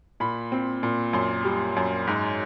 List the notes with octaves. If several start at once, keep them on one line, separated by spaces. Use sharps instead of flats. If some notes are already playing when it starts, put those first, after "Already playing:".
A#2 B5
C4
A#2
F#2 C6
G3
F#2
G#2